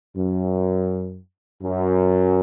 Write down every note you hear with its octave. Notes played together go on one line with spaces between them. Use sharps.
F#2
F#2